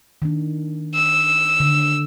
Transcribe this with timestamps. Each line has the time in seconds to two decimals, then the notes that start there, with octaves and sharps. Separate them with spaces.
0.22 D#3 D4
0.95 E6
1.60 D3